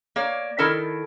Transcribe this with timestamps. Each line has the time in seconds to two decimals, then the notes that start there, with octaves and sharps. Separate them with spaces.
0.16 A#3 C#5 D5
0.58 D#3 E4 A4 A#4 A5